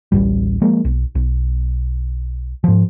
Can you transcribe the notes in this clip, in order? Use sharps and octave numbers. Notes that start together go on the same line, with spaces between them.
D1 A1 F2 G3
F3 G#3 A#3
B1
B1
G#2 F3